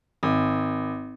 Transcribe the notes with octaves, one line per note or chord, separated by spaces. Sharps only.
G#1